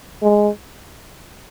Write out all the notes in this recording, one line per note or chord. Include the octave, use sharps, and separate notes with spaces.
G#3